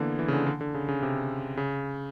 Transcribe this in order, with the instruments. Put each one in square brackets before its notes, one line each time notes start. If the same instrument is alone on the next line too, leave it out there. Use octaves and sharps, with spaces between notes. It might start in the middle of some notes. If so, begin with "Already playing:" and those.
Already playing: [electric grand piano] D3 E3 A#3 B3
E3
C#3
D3
D3
D3
C#3
C#3
C3
C#3